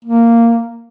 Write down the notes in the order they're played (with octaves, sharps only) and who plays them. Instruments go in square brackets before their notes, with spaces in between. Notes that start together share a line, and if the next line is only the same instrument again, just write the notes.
[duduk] A#3